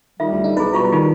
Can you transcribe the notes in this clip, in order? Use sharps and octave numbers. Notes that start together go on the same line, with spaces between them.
D#3 G3 F4 E5
D2
D3 D#4
B1 D#4 E4 G#4 B4
B2 G3 F4 B4 A#5 C#6
D#3 D#4 F4